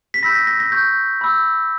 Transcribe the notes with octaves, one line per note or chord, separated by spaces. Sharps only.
B6
B5 E6 G6 A#6
A#6
A#6
A#6
C#6 G6
B5 E6 G6